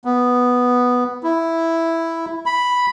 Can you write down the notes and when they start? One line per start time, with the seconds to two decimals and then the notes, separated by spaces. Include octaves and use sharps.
0.05 B3
1.23 E4
2.46 B5